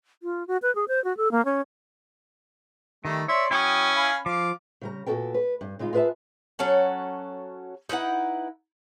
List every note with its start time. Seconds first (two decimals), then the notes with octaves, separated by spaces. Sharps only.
0.23 F4
0.47 F#4
0.62 B4
0.75 G#4
0.88 C5
1.04 F#4
1.17 A4
1.31 A#3
1.45 C#4
3.05 D#3 G3 A3
3.28 C#5 D5 E5 C6
3.51 F#3 C#4 E4 G5 C#6 D#6
3.96 F5 G#5 B5
4.26 F3 F5 D6
4.81 C#3 G3 A#5
5.06 A#2 B3 F#4 A4 A#4 G5
5.34 B4
5.61 G2
5.79 C#3 G#3 D#4 F4
5.93 F4 G#4 B4 D5 E5 A5
6.59 F#3 C#4 A4 F#5
7.89 D#4 E4 B4 F#5